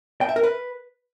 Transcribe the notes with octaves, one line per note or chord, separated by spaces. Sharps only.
G5
E5
A#4
B4